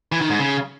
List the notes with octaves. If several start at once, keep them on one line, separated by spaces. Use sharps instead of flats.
E3
D#3
G#2
C#3